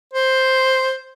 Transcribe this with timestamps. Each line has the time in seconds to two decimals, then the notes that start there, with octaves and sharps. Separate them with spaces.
0.13 C5